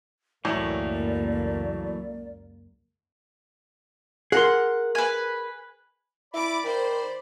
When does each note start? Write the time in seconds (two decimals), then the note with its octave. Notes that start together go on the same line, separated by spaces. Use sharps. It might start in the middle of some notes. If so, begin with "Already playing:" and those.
0.45 C#2 F#2 A2 E3 F#3 A3 A#3 D5
4.32 G#4 A#4 F#5 C6
4.95 B4 G#5
6.34 E4 D5 B5 D6
6.64 D#3 C5